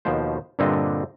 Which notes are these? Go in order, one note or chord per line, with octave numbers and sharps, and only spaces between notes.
D#2 B2 F3 C5
G2 A#2 D3 C4 D4 D#5